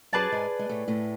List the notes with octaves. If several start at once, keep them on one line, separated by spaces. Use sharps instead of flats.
F#2 F#3 G#4 B4 D5 A5
G#2 G#3
G#3
A2 A3
A2 A3